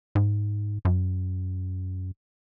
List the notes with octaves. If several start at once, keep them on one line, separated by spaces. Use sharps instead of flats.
G#2
F#2